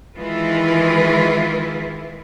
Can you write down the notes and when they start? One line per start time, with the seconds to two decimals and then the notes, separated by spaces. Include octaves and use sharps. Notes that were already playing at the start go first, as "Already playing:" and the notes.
0.18 D#3 E3 G#3 E4 F4 B4